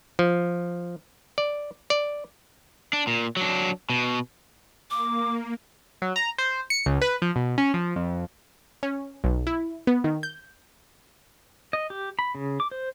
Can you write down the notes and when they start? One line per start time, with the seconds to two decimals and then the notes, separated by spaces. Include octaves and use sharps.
0.19 F3
1.38 D5
1.90 D5
2.93 D4
3.07 A#2
3.37 F#3 D4
3.90 B2
4.91 A#3 D6
6.02 F#3
6.16 A#5
6.38 C5
6.70 C#7
6.86 C#2
7.02 B4
7.22 F3
7.36 B2
7.58 C#4
7.74 F3
7.96 F2
8.83 C#4
9.24 B1
9.47 E4
9.87 B3
10.04 D#3
10.23 G6
11.73 D#5
11.90 G4
12.19 B5
12.35 C#3
12.60 D6
12.71 C5